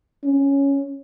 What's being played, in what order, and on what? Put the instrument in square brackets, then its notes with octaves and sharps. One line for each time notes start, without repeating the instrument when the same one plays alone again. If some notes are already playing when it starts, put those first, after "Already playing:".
[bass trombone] C#4